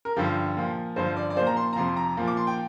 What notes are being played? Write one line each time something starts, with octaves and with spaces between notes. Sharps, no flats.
A#4
G2 D3 F3 G4
A#2 F3
G2 D3 F3 C5
D5
D5
A#2 F3 C5
A#5
C6
A#5
F2 C3 F3 C6
A#5
A#2 F3
D6
C6
G5